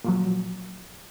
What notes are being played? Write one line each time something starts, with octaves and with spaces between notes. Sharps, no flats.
A#2 F3 F#3